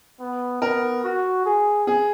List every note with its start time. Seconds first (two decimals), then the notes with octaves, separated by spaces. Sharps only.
0.20 B3
0.62 B3 A#4
1.04 F#4
1.45 G#4
1.87 G#4